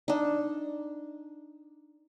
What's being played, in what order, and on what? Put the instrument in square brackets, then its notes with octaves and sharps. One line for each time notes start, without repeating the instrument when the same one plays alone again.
[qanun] D4 D#4